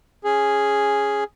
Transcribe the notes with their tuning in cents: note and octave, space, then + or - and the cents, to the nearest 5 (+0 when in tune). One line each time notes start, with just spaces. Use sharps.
C#4 +0 G#4 +0